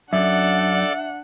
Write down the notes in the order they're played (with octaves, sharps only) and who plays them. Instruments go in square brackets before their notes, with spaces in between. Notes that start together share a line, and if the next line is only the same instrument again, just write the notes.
[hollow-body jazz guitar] F#2 [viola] D4 F#5 [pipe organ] A4 D5 D6 [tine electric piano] E5